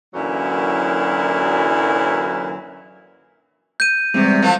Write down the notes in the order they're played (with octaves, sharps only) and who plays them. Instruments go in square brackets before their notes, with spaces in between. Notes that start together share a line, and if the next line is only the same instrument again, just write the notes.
[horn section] F#2 A#2 D3 E3 F#3 E4
[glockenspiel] G6 D#7
[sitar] E2 C3 [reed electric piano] G3 G#3 C4
[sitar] E3 F3 A4